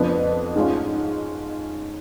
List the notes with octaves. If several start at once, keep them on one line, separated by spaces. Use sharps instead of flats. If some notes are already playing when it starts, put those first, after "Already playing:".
Already playing: F2 F3 B3 D4
G#2 G#3 C#4 F4